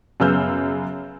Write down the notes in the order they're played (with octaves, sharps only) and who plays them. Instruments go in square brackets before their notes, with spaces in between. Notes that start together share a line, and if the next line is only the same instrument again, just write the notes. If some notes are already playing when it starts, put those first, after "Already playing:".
[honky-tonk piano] F#2 C#3 B3 E6 F6 G6